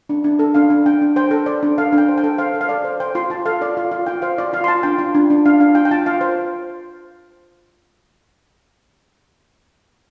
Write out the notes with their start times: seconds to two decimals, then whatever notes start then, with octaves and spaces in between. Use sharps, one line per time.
0.09 D4
0.24 D4
0.39 A4
0.54 D4 F5
0.70 D4
0.86 D4 G5
1.01 D4
1.16 C5 G5
1.31 A4
1.46 C5 D5
1.63 D4
1.78 A4 F5
1.93 D4
1.98 G5
2.09 C5
2.18 G5
2.24 A4
2.38 C5 F5
2.54 A4
2.61 F5
2.69 A4 D5
2.85 C5
3.00 C5 G5
3.15 F4 C6
3.30 F4 A5
3.46 A4 F5
3.61 F4 D5
3.77 F4 F5
3.92 F4 F5
4.07 F4 G5
4.22 C5 F5
4.38 F4 D5
4.53 F4 F5
4.64 C6
4.68 F4 A5
4.83 D4 G5
4.98 F4
5.15 D4
5.30 D4
5.46 D4 F5
5.60 D4 F5
5.75 F4 G5
5.85 G5
5.91 F4 A5
6.06 F4 F5
6.21 C5